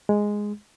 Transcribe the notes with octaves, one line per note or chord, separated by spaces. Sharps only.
G#3